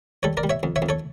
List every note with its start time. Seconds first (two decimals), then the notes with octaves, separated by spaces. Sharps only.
0.23 G3 A4 C#5
0.37 A#4 D5
0.44 G3
0.50 C#5 E5
0.63 F2
0.76 C#5 E5
0.82 F2
0.89 A4 C#5